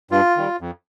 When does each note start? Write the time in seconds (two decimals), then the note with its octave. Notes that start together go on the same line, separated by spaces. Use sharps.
0.11 G2 F4
0.36 D#3 G3
0.61 F2